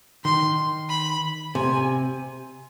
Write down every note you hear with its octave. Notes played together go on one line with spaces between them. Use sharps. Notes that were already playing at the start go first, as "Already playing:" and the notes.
D#3 C6
B5
C3 G#5